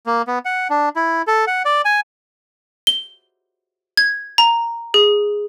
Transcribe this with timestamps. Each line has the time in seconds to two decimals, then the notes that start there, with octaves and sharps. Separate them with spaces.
0.06 A#3
0.27 B3
0.45 F#5
0.70 D4
0.96 E4
1.27 A4
1.47 F#5
1.65 D5
1.85 G#5
2.87 G7
3.97 G#6
4.38 A#5
4.94 G#4